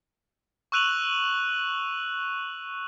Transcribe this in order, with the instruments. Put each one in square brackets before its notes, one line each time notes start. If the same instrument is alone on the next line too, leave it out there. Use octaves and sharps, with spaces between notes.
[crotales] C#6 E6 F#6 D#7 F7 F#7